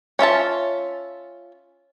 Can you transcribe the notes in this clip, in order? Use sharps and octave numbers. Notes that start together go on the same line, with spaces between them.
C#4 F4 E5 A5